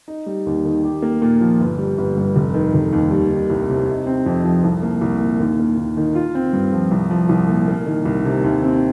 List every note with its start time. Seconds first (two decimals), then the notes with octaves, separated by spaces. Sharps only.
0.08 D#4
0.26 G3
0.46 D#2
0.65 D#3
0.83 G4
1.02 A#3
1.22 A#2
1.41 F3
1.60 G1
1.79 G3
1.98 G1
2.17 G2
2.36 F1
2.54 D#3
2.74 F1
2.93 D#2
3.11 G3
3.31 D#3
3.50 C2
3.69 C3
3.88 D#4
4.06 C4
4.26 F2
4.45 F3
4.63 C2
4.83 A#3
5.01 C2
5.20 A#2
5.40 D#2
5.59 A#3
5.77 D#2
5.97 D#3
6.15 F4
6.35 C4
6.53 G2
6.73 F3
6.91 C2
7.11 F3
7.29 C2
7.48 A#2
7.68 A#3
7.86 D#3
8.06 C2
8.25 C3
8.44 D#2
8.63 C4